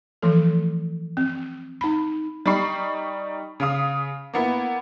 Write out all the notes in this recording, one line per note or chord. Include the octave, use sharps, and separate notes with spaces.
E3 F3 A3 A4
C4
D#4 B5
G3 D#4 B5 C#6 C7
C#3 F5 D#6
A#3 B3 E4